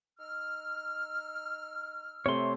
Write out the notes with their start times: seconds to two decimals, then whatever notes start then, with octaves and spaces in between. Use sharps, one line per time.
0.19 D#4 E6 F6
2.26 C3 A3 C#5 C6